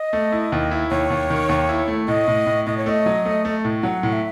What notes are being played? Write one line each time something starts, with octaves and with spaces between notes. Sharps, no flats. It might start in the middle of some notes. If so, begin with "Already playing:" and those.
Already playing: D#5
A3
E4
D#2
E4
D#2 C#5
D#2
D#3
D#2
E4
A3
A2 D#5
A2
A2
A2 D#5
C#5
A3 D#5
F#3
A3
A3
A2
F#3 F#5
A2
E5